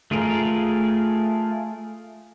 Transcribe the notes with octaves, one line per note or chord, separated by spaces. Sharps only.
A3 F4 G#4 A#4